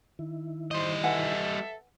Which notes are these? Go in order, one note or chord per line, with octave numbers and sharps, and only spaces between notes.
D#3 E4
G3 C5 D#5
A4 B4 E5 F#5 G#5